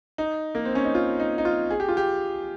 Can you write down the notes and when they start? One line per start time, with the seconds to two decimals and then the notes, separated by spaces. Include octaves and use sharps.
0.18 D#4
0.55 A#3
0.65 C4
0.75 C#4
0.85 D#4
0.95 F4
1.20 D#4
1.38 D#4
1.45 F4
1.71 G#4
1.80 G4
1.89 F4
1.97 G4